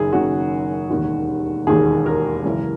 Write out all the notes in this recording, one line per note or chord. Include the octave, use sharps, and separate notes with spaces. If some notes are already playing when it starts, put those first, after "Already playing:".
Already playing: F#1 F#2 D#3 G#4
F#1 F#2 D#3 F#4
E1 D#2 D#3
E1 D#2 D#3 G#4
A#4
G#1 F#2 C#3 E3